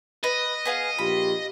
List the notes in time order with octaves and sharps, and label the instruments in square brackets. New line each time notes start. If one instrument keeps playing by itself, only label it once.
[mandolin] B4 [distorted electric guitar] D#5
[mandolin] B3 G#4 F5
[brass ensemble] A#1 F4 G4 [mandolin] B5